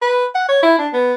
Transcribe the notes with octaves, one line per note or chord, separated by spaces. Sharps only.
B4
F#5
C#5
E4
D4
B3